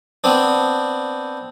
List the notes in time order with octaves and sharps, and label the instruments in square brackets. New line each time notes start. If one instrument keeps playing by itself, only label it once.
[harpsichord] B3 C4 D4